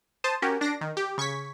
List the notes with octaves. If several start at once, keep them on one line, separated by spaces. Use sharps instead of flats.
C5 A5 D#6
C#4 F#4 G4 A#4
D4 A#6 C7 D7
D#3
G4
C#3 C#6 G#6 B6